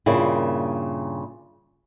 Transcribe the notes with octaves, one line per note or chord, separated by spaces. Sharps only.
G2 A#2 C#3 A#3 E4